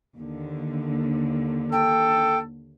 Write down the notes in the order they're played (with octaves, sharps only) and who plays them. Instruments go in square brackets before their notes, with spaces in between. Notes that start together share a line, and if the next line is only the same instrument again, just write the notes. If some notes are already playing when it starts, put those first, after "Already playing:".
[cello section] D#2 D3
[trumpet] A4 [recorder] G5